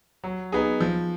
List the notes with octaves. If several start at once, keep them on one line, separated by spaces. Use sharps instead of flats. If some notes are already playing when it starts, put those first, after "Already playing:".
F#3
B3 D#4 G#4
F3